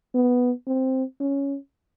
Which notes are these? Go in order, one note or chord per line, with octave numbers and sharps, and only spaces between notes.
B3
C4
C#4